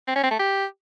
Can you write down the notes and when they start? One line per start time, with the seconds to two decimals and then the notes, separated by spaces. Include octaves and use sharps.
0.08 C4
0.16 C#4
0.23 C4
0.31 A3
0.39 G4